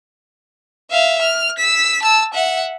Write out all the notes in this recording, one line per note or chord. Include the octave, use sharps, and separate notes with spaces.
E5 F5
F6
E6 B6
A5 E6
E5 F#5